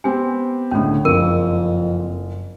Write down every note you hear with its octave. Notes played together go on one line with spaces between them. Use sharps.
B3 C4 G4 G#5
C#2 A2 D3 C#4 A4
F#1 F2 G#4 A#4